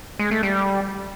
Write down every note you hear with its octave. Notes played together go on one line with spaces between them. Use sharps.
G#3
A3
G3